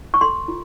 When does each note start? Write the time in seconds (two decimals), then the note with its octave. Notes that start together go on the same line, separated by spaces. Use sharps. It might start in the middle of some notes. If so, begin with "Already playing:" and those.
0.14 C#6
0.21 A4 C6
0.48 F4